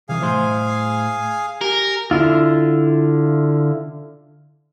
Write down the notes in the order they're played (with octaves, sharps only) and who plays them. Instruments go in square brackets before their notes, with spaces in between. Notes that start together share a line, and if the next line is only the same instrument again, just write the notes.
[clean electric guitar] C3 E3 [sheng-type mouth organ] G#4 F5 G#5
[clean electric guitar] A2 C5 C6
[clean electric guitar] G4 G#5 [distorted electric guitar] A#4
[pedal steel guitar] D3 E4 F4